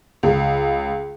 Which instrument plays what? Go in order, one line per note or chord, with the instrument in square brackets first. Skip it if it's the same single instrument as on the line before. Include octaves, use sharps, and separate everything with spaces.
[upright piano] C#2